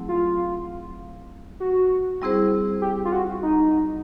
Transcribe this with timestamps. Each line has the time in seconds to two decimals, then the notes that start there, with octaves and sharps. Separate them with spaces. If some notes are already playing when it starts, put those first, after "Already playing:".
Already playing: F#3 A3 C4 E4 G#4
0.09 F4
1.60 F#4
2.22 G3 C4 E4 G#4 C5
2.82 G4
3.05 F4
3.12 F#4
3.43 D#4